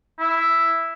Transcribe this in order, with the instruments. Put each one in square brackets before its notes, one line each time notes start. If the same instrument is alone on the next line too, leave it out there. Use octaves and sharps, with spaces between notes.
[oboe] E4